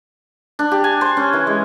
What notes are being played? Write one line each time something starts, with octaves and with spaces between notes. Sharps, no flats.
D4
G4
G#5
C5
C#4
E3
G#3